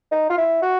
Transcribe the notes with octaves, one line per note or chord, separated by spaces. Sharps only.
D#4
F4
E4
F#4